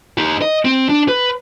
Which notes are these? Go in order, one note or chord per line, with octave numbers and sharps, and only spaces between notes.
D#4 G4
D#5
C4
D4
B4